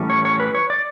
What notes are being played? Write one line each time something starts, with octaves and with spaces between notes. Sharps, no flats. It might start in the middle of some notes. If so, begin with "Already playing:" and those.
Already playing: A2 E3 G3 C#4
C#5
C#5
B4
C#5
D5